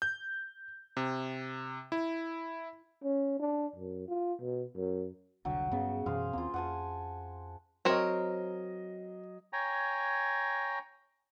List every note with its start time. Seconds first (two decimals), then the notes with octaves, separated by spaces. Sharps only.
0.02 G6
0.97 C3
1.92 E4
3.03 C#4
3.40 D4
3.76 F#2
4.08 F4
4.40 B2
4.75 F#2
5.45 E1 C2 D3 F#3 G5
5.72 G2 C#3 B3
6.06 F#2 B2 E3 G#4 C5 F5
6.33 D#2 A#3 C4 F4
6.54 F2 F#5 G#5 A5
7.85 F#3 C4 A#4 C#5 D#5
9.53 C#5 G5 G#5 A#5